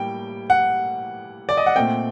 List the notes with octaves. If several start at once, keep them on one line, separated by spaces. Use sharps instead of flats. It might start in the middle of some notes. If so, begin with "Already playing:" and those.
Already playing: A2 G3 A#3 G5
F#5
D5
D#5
F#5
A#2 A3 C4 G5